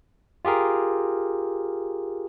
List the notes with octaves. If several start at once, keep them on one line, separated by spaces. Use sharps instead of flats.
F4 G4 G#4 A#4